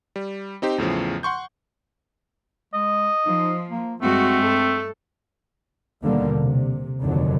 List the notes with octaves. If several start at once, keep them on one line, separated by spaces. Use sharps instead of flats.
G3
C4 D#4 G4 C5
E2 A2 C#3 F3
F#5 C6 C#6 G6
G#3 D#5
F3 D#4
A#3
G2 G#3 A3 C4 F#4
A4
D#2 B2 D3 G3 A#3
C3
F1 D#2 D3 F#3